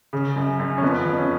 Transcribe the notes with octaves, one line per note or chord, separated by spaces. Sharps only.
C#3
F#2
F#2
C#4
F2 B3
F2
C#4